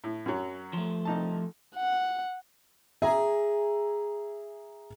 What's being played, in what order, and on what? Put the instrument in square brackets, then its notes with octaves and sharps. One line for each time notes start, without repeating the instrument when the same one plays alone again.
[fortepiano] A2
F#2 F#3
[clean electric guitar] F3 A3
[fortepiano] C2 D#4 A5
[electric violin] F#5
[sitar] G#4 [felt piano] E5 A#5